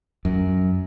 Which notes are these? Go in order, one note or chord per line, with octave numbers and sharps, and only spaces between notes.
F#2